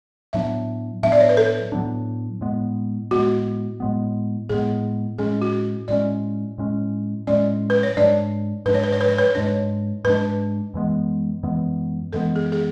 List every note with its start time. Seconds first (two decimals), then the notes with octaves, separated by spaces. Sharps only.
0.33 A2 F#3 B3 D4 E5
1.03 A2 F#3 B3 D4 E5
1.12 D5
1.21 C#5
1.29 B4
1.37 A4
1.72 A2 F#3 B3 D4
2.41 A2 G#3 B3
3.11 A2 G#3 B3 F#4
3.80 A2 G#3 B3
4.49 A2 G#3 B3 G#4
5.18 A2 G#3 C#4 G#4
5.42 F#4
5.88 A2 G#3 C#4 D5
6.58 A2 G#3 C#4
7.27 A2 G#3 C#4 D5
7.70 B4
7.83 C#5
7.96 G#2 G#3 D4 D5
8.66 G#2 G#3 D4 B4
8.74 C#5
8.83 B4
8.92 C#5
9.01 B4
9.09 C#5
9.18 B4
9.35 G#2 G#3 D4 C#5
10.04 G#2 G#3 D4 B4
10.74 F#2 E3 G#3 B3
11.43 F#2 E3 G#3 B3
12.13 F#2 E3 G#3 B3 A4
12.36 G#4
12.52 G#4